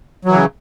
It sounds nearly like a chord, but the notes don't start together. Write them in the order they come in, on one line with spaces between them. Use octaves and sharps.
F#3 E3 C#3